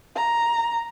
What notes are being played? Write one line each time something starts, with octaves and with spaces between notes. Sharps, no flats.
A#5